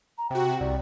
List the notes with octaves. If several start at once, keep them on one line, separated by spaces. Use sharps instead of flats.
A#5
C3 F#4 G5
C2 D5